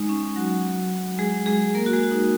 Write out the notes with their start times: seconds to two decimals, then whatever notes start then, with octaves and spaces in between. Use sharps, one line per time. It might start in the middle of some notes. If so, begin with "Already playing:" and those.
Already playing: G#3 D#4
0.09 C#4
0.36 F#3 F#4
1.19 G#3 G#4
1.46 G#3 G#4
1.75 A#3 A#4
1.86 F#4
1.93 G#3 G#4
2.03 F#4
2.11 D#4